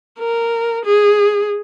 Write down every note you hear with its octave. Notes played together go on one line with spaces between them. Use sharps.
A#4
G#4